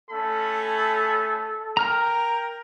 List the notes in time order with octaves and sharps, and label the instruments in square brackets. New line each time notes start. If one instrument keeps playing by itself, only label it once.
[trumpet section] A3 C#4 B5 [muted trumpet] A4
[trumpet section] A#4 G5 [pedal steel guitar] A#5 F6